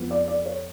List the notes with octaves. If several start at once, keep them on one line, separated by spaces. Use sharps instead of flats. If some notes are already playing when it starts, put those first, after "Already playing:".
Already playing: F2 F3 G#3 B3
D5
D5
C#5